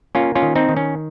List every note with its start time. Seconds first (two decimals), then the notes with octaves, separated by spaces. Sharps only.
0.15 A#3 C#4 F4
0.35 C#4 F4
0.42 D#3
0.55 C4 D#4
0.69 D#3
0.77 C#4